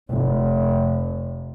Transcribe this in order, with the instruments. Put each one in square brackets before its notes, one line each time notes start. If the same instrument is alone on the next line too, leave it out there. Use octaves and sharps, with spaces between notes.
[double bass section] F1